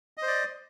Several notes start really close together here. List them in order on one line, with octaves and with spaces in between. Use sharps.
D#5 C5 D5